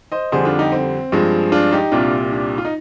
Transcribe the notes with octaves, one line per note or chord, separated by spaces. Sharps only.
C5 D#5
F2 D3 G3 G#4 C5
D4 F4
D#4 G4
C4
G2 F3 G#3
D4 F4
D#4 G4
C2 A#2 G3 D4 F4
D4
F4
D#4